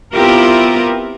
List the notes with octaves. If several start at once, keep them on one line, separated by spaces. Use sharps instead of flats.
B3 C4 E4 F4 G4 A#4